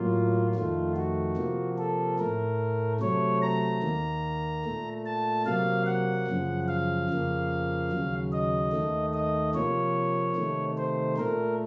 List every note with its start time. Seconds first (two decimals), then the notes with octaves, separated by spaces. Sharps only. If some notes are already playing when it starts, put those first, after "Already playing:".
Already playing: A2 F#3 A#3 F4
0.55 F2 D#3 A3 F4
0.96 F#4
1.37 C3 F3 A#3
1.78 A4
2.19 A2 A3 A#4
3.00 C3 F#3 A3 C#5
3.42 A#5
3.83 D#2 D#3 A#3
4.65 A#2 A3
5.06 A5
5.46 C3 F#3 A#3 F5
5.86 F#5
6.28 F#2 C#3 F3
6.68 F5
7.10 F2 C#3 F3 A#3
7.91 D#2 C#3 F#3
8.33 D#5
8.72 D#2 D#3 A3
9.14 D#5
9.55 C3 F3 A#3 C#5
10.36 C3 D#3 A3
10.77 C5
11.18 A#2 A3 A#4